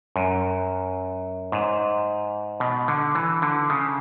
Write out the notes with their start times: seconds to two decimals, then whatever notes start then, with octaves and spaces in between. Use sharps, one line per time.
0.16 F#2
1.52 G#2
2.60 B2
2.88 D3
3.15 E3
3.42 D3
3.70 C#3